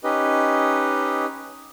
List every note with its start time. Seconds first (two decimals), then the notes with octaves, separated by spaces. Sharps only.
0.04 C#4 D#4 G4 B4 D#5